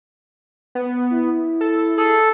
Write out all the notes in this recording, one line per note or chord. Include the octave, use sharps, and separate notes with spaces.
B3
E4
A4
G#4 A4